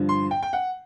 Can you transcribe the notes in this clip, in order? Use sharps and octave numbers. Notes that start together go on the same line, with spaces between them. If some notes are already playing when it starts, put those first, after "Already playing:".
Already playing: G2 D3 F3
C6
G5
G5
F#5